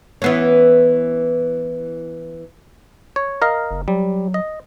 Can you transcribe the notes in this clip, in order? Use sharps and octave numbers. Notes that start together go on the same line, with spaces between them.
E3 B3 C#4
C#5
A#4 D#5 F5
F#1
F#3 G3
D#5